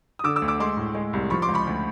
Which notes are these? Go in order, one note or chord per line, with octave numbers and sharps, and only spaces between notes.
D#6
D3 D6 E6
D6 E6
D2
D6 E6
G#3 C6 D6
A2
G#3
C2
F3 B5 C#6
C6 D6
C#2
B5 C#6
D2